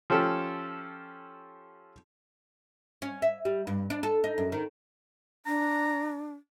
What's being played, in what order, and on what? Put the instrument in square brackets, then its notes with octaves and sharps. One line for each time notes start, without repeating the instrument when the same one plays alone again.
[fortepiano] F3 C#4 G4 A4
[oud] C#4
E5
G3
G2
D4
A4
D#4
F#2
D#3
[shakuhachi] D4 [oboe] A#5